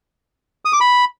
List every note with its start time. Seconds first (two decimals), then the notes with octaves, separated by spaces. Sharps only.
0.65 D#6
0.73 D6
0.81 B5